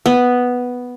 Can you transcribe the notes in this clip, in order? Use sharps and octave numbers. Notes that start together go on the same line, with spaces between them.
B3